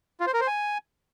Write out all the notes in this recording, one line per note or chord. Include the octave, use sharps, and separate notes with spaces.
F4
C5
A#4
C5
G#5